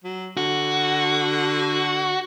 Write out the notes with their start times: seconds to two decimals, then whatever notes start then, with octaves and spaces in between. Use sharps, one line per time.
0.04 F#3
0.37 D3 F#4